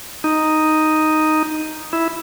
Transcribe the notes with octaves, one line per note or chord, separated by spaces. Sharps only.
D#4
E4